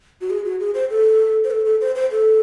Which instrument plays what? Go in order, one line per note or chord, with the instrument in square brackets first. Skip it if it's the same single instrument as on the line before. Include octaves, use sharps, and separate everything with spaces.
[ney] F#4
G#4
F#4
G#4
C5
A4
C5
A4
A4
C5
C5
A4